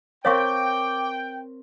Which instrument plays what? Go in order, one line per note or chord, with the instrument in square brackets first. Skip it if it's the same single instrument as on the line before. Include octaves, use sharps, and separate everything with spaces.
[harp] C4 A#4 A6 [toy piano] C#5 F5 C#6 [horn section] G5 [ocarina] D6